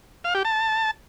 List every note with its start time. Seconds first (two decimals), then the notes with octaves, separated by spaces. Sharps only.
0.24 F5
0.35 G4
0.45 A5